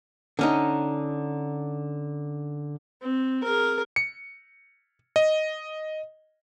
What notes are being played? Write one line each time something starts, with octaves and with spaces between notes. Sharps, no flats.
D3 C#4 D#4
C4
G#4 A#4
C#7
D#5